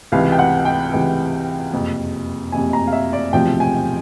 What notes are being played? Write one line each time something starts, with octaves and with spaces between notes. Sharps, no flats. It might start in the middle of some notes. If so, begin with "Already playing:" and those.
C#2 C3 E3 F5
G5
F#5
G5
C#2 C3 E3
F#1 F2 C3
F#1 F2 C3 G#5
A#5
F5
E5
D5
E1 D2 C3 F3 G5
G#5